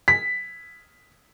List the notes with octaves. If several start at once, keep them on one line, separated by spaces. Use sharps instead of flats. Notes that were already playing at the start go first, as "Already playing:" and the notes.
B6